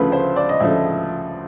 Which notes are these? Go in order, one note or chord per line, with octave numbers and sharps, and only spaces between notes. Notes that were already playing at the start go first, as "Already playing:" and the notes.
Already playing: D2 C#3 F3 A3 B4
C5
D5
D#5
D2 C#3 F3 A3 E5